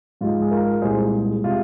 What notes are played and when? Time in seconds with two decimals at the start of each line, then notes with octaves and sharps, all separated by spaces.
0.21 G#2 F3 G#3 F4
0.42 G#4
0.51 F4 A#4
0.82 C2 A#2 G#3 G#4 C5
1.44 C3 G#3 F4